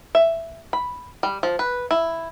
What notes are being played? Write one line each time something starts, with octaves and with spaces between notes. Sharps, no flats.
E5
B5
G3
F3
B4
E4